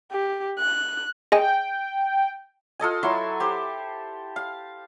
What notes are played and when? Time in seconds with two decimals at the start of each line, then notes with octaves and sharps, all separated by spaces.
0.11 G4
0.59 F#6
1.32 G#4 D#5 G5 G#5
2.80 F4 A4 D#5 G#5
3.03 F#3 E4 E5 C6
3.40 G4 C5
4.36 F5